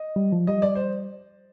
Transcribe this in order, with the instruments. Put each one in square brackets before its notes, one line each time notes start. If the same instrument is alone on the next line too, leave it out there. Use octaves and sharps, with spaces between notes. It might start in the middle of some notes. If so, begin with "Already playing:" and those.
Already playing: [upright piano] D#5
[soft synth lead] G3
F3
[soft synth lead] G3 [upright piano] D#5
[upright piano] D5
C5